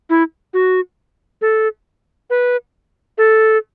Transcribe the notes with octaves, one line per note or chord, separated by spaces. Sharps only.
E4
F#4
A4
B4
A4